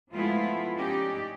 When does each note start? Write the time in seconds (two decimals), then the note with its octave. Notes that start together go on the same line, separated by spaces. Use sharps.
0.11 F3 G#3 A3 B3 E4 F4
0.75 C#4 D#4 G4 D5